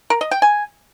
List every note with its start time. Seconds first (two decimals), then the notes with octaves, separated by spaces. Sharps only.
0.10 A#4
0.21 D#5
0.31 G5
0.42 G#5